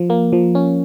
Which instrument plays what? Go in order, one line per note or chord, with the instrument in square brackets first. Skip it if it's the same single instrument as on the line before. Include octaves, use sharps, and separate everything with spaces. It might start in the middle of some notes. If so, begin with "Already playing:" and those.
Already playing: [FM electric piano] F3
A#3
F3
C#4